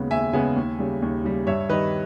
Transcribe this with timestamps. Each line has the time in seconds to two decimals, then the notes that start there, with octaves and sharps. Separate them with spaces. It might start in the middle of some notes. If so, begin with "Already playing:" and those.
Already playing: D#2 C#3 G#3 B3
0.11 D#2 E5 G#5
0.33 C#3 G#3 B3 E5 G#5
0.56 D#2
0.78 C#3 G3
1.02 D#2
1.24 C#3 G3
1.47 G2 C#5 E5
1.69 D#3 G3 B4 D#5